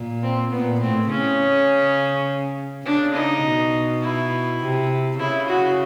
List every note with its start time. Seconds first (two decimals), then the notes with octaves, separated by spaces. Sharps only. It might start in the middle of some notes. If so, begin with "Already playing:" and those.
Already playing: A#2
0.23 C4
0.51 A#2 B3
0.81 A2 C4
1.09 C#3 C#4
2.85 C#3 D4
3.14 D#4
3.44 B2
4.02 E4
4.60 C3
5.19 C#3 E4
5.49 F#4